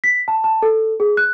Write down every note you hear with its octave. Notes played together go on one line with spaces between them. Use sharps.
B6
A5
A5
A4
G#4
F#6